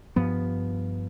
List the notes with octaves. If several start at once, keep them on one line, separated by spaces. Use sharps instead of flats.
G2 F3 B3